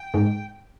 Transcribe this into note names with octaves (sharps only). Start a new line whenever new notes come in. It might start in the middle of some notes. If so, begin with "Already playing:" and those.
Already playing: G5
G#2